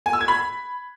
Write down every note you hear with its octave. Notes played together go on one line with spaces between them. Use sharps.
G#5
E6
G#6
B5